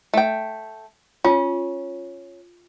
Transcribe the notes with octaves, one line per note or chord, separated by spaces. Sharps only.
A3 G5
C#4 F4